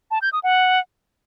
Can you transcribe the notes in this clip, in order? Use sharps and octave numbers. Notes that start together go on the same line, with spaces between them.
A5
G6
D#6
F#5